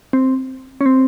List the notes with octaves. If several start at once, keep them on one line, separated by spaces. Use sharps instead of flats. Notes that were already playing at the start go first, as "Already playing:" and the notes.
C4
C#4
C4